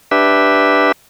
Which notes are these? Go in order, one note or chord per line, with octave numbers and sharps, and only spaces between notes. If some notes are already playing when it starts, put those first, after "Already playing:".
D4 G4 B4 E5